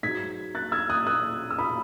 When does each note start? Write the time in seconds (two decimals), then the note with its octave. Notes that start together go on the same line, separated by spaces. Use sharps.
0.03 G#2 F#3 G#6 B6
0.55 F#6 A6
0.72 E6 G#6
0.90 D#6 F#6
1.07 D#6 F#6
1.51 E6
1.59 B5 D#6